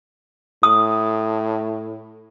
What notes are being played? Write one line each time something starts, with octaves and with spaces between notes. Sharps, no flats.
A2 D#6